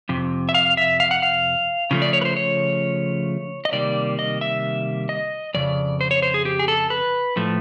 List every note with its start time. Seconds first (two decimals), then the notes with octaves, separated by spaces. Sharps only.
0.09 F2 C3
0.49 E5
0.54 F5
0.77 E5
1.00 F5
1.11 F#5
1.22 F5
1.91 C#3 F3 A3
2.02 D5
2.13 C#5
2.21 B4
2.25 C5
2.37 C#5
3.65 D#5
3.72 C3 D#3 G3 A#3 D5
4.19 D#5
4.41 E5
5.09 D#5
5.54 F2 C#3 D5
6.01 C5
6.11 C#5
6.22 C5
6.34 G#4
6.45 G4
6.59 G#4
6.68 A4
6.90 B4
7.36 A2 F3 A3